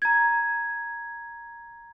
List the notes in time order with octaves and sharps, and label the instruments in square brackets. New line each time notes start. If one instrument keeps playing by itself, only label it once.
[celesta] A#5 G#6